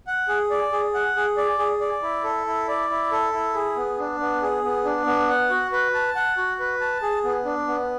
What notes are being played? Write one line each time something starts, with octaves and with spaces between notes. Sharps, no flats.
F#5
G#4
D5
G#4
F#5
G#4
D5
G#4
D5
E4
A4
E4
D5
E4
A4
E4
G#4
B3
D4
B3
G#4
B3
D4
B3
F#5
F#4
B4
A5
F#5
F#4
B4
A5
G#4
B3
D4
B3